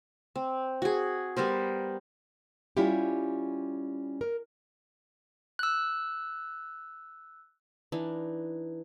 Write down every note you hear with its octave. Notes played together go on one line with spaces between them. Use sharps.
C4
F#4 G#4
G3 B3 A#4 C5
G3 C#4 E4 F4 G4
A#4
E6 F#6
E3 D4 D#4